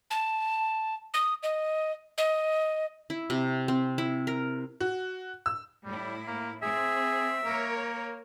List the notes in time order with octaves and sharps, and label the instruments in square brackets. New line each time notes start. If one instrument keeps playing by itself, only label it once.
[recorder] A5
D#6
D#5
D#5
[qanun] E4
C3
C4
E4
A#4
[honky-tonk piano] F#4
E6
[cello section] A2 E4 [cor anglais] G3
[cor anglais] A#3
[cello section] C4 [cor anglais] G#4 [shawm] E5
[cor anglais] A#3 [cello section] A#4 C#5